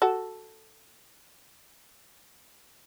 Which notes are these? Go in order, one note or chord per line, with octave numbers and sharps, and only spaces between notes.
F#4 A4